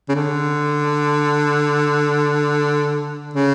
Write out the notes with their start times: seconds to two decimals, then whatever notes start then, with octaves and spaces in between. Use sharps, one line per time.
0.08 C#3
0.15 D3
3.34 C#3